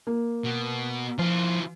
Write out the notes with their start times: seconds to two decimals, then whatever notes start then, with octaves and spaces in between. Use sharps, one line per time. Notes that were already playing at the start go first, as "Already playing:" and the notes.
0.07 A#3
0.44 B2
1.19 E3 F3 F4